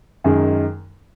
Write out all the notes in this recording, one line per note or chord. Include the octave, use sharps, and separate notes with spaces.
F#2 D#3 G#3